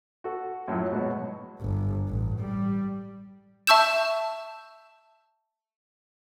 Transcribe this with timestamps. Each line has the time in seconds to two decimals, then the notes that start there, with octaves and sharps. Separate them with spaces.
0.24 F#4 A4
0.68 F#2 A2 F3 F#3
0.92 G#2 B2 F#3
1.61 G1
2.08 A1
2.40 G3
3.67 E5 A5 C#6 E6 G6 E7